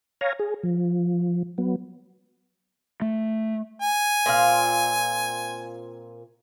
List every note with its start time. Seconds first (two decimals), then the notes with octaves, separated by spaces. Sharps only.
0.21 C#5 F5 G#5 A#5
0.39 G#4
0.63 F3
1.58 F#3 B3
3.02 A3
3.81 G#5
4.26 A#2 C4 F4